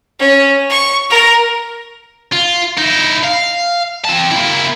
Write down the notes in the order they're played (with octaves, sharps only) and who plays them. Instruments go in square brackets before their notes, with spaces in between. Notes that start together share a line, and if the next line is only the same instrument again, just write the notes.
[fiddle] C#4
C#6
A#4
[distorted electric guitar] F4
D#4 E4
F5
C4 A5
A#3 E4